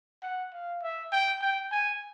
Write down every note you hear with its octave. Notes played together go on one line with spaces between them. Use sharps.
F#5
F5
E5
G5
G5
G#5